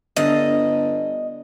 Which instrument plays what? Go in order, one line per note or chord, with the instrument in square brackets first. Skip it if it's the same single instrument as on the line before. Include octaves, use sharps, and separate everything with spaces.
[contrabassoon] G1 [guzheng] D3 F5 [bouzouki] D#5